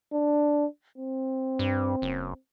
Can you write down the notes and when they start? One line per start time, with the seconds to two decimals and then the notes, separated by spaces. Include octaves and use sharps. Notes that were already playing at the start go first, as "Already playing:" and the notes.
0.13 D4
0.98 C4
1.59 G2
2.02 F#1